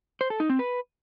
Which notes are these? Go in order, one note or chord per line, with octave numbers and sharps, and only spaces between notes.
C5
A4
D#4
C4
B4